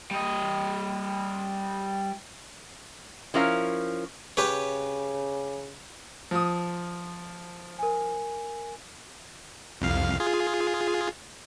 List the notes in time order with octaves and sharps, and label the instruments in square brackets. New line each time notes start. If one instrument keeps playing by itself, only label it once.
[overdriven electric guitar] G3 D#5
[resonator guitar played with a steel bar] F3 C#4 E4 A#4 C#5 F5
[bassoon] C#3 [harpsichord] G4 B4 C#5
[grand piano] F3 D#6
[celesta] A#4 G#5
[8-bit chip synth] C2 F2 F5
F4 G#4